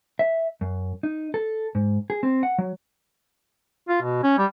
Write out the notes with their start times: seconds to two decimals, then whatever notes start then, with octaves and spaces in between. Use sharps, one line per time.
0.19 E5
0.61 F#2
1.03 D#4
1.34 A4
1.75 G#2
2.10 G#4
2.23 C4
2.43 F#5
2.58 F#3
3.88 F4
4.02 B2
4.23 C#4
4.38 G3